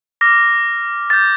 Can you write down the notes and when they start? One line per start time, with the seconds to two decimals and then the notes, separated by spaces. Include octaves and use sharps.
0.21 D6 F6 A#6
1.10 D6 G6 A6